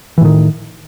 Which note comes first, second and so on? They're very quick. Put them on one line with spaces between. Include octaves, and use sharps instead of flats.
E3 A2 D#3